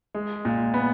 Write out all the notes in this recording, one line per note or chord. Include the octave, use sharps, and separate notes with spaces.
G#3
A#2
B3